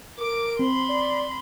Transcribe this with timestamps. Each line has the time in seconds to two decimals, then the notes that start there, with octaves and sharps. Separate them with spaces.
0.19 A#4 D6 D7
0.59 C4 B5 C6
0.89 D5